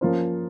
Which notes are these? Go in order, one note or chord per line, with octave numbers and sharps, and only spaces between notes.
F3 A#3 C#4 F4 C5